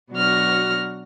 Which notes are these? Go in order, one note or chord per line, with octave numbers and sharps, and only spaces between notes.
B2 F#3 D4 F#4 F6 A#6